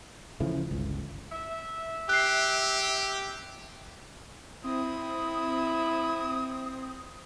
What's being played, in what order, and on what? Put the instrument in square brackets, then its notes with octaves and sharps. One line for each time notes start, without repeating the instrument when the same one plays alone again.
[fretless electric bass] C#3 E3 F3 A3
G1 C#2
[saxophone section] E5
[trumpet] G4 [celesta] F#6 C7
[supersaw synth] C4 [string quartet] E4 [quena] D#6